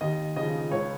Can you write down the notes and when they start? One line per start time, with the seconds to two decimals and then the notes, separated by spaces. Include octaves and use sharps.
0.01 D#2 D#5
0.36 C#3 F3 D#5
0.71 C#2 C#5